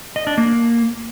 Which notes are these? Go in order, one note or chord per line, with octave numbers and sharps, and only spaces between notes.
D#5
D4
A#3